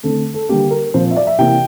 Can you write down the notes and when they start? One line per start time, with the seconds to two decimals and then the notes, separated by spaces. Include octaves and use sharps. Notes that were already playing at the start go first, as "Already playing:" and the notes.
0.03 D3 A3 C4 A4
0.34 A4
0.49 D3 G3 A#3 G4
0.71 A#4
0.94 A#2 F3 C4 C5
1.11 E5
1.16 D5
1.27 E5
1.39 C3 E3 A#3 G5